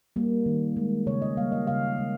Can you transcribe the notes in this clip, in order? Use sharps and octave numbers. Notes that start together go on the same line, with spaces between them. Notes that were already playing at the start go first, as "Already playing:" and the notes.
G3 A#3
D#3
G#3
C#3 C#5
D#5
G3 A#3 F5
D#5
C#3 F5
G#3